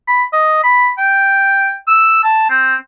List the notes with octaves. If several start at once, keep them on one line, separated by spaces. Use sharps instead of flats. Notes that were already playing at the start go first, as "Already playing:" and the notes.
B5
D#5
B5
G5
E6
A5
C4